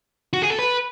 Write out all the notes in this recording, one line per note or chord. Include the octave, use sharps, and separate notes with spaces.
F#4
G#4
A4
B4